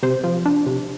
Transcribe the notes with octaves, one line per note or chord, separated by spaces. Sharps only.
C3 C5
F3
D4
C3